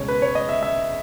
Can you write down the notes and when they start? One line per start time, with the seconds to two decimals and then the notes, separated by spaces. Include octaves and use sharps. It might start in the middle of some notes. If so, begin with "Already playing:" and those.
Already playing: C#2 B2 G#3 C#5
0.08 B4
0.22 C#5
0.35 D#5
0.49 E5
0.63 E5